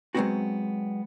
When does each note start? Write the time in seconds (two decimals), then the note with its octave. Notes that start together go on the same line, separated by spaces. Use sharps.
0.15 F#3 G#3 A3 B3 C4 F#4